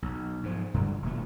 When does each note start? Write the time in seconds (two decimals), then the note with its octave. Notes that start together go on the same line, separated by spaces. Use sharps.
0.02 B1
0.43 G#2 F3
0.74 G2 D3 F#3 G3
1.02 D#1 B2 A3